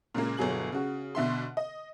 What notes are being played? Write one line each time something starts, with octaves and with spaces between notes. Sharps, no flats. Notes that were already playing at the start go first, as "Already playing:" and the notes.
A#2 C#3 G#3 A#3
G1 B2 F#3 G#4 F#7
C#3 F#4
B2 D3 E5 C6
D#5